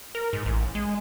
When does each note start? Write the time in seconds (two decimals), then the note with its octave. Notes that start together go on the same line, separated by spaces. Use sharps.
0.15 A#4
0.33 G#2
0.46 A1
0.75 G#3